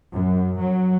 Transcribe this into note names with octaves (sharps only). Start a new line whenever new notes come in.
F#2
F#3